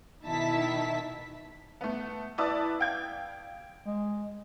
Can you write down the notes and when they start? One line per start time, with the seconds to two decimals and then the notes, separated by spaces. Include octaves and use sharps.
0.23 B2 D#3 E4 E5 A5 B6
1.81 A3 B3
2.38 E4 B4 D5 A5 D#6 E6
2.79 F5 G5 G#6
3.86 G#3